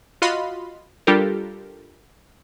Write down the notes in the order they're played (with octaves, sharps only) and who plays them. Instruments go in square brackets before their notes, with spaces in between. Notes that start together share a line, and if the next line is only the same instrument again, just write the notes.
[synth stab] F4 F#4 D#5 F5 B5 C6
G3 D4 F4 G4 A4 A#4